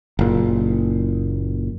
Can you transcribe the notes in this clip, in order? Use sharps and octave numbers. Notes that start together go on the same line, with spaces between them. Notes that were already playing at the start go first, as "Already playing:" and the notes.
F#1 A#2